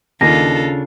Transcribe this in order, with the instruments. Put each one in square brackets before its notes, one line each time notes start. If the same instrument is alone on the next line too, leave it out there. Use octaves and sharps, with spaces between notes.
[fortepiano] D#2 [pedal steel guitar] C#3 D4 [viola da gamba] F4 A4 [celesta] A#6